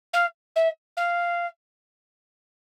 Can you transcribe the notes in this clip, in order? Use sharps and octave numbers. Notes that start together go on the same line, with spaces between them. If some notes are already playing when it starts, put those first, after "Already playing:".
F5
E5
F5